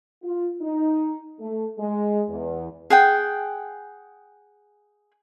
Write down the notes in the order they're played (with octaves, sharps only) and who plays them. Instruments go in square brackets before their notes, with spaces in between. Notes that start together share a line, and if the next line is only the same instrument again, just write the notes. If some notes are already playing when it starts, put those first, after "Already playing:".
[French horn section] F4
D#4
A3
G#3
E2
[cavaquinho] G#4 F#5 G5